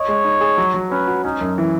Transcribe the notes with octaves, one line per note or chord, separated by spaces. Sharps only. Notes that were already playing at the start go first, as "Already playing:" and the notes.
Already playing: C#5 D#5
G#3
D#4
G#4
F#3
F#3
C#4 B4
F#4
C#4 D#4
F#2
E3